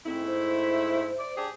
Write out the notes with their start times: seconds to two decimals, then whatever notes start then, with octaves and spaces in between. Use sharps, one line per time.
0.06 G#2 A3 C4 E4
0.26 C5
1.19 D5
1.37 D4 G4 G#4